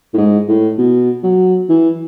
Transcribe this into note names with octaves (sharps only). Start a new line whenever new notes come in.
A2
G#2
A2
B2
F#3
E3